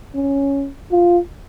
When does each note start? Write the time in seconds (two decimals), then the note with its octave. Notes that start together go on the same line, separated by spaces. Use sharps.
0.15 C#4
0.91 F4